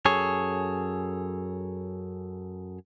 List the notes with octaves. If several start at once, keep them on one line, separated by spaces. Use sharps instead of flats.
F#2 G#4 A4 C#5